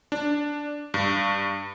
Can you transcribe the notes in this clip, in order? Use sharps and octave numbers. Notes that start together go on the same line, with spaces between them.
D4
G2